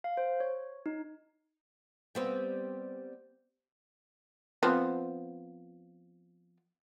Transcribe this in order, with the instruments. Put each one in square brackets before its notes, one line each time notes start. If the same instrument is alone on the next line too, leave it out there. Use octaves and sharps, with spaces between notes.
[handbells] F5
C5
C#5
D#4
[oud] G3 B3 C4
[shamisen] F3 B3 C4